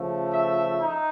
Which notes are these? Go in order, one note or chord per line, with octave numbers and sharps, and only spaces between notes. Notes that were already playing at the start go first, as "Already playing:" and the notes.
Already playing: C#3 F3 A3
E5
D#4